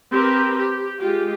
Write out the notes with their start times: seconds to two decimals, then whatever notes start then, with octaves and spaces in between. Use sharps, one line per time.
0.11 C4 G4 A#4 B4
0.57 G4
0.98 G#3 F4 G4